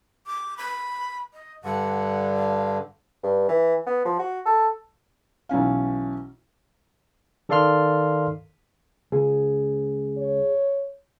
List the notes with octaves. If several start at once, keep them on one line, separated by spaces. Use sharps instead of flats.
D6
B5
D#5
G2 D3 F#5
F5
G2
E3
B3
F3
F#4
A4
B1 E3 C#4 F5
D#3 A4 D5 F5 C6 F6
C#2 G#4
C#5